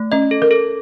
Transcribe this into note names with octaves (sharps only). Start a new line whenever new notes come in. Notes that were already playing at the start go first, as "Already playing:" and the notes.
Already playing: A3
C#4 D#5
A4
A#4
A4